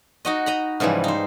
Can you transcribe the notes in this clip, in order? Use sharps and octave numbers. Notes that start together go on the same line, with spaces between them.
D#4 F#4 D#5
D#5 A#5 B5
G#2 C#3 E3 F3 G3
D#4 C5